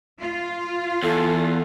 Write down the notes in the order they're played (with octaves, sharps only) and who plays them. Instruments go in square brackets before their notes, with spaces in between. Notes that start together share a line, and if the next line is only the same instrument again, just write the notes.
[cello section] F4
[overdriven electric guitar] E2 [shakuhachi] A4